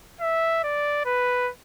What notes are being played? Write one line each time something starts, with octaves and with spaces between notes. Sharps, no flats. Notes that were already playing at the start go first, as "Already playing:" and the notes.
E5
D5
B4